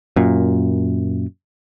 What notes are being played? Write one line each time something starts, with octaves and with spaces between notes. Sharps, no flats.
F#2 A#2